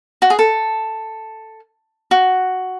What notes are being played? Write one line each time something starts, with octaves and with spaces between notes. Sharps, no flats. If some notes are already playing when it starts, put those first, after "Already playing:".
F#4
G#4
A4
F#4